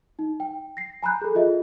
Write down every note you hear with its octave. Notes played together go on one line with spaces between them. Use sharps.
D#4
G5
A#6 C7
G#5 A#5 B5 F#6 G6
G#4 A4
F4 G#4 D#5 E5